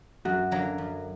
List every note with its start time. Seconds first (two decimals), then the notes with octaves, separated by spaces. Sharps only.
0.25 F#2 F#4
0.51 D3 F#3 A#3
0.78 F#2